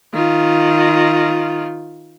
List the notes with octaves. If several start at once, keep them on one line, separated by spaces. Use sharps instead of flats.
D#3 F4